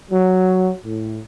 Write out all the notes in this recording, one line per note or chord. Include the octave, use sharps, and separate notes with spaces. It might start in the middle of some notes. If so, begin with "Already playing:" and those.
F#3
A2